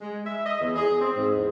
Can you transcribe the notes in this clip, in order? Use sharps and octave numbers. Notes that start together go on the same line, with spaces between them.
G#3
E5
D#5
E2
G#4
C4
G#2
E2